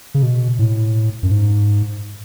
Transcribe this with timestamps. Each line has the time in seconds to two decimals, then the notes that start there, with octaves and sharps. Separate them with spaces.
0.14 C#3
0.23 B2
0.59 A2
1.23 F#2
1.31 G#2